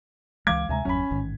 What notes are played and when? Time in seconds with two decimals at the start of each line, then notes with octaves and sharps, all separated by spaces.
0.47 C#2 E3 G#3 F5 D6 G#6
0.69 D2 C3 G#3 E5 G#5 A#5
0.85 G1 E2 F#3 C#4 B5
1.11 A1 G#2 D#3